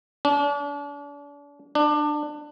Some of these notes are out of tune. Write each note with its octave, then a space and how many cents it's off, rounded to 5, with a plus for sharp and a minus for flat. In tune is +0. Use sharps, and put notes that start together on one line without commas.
D4 -40
D4 +20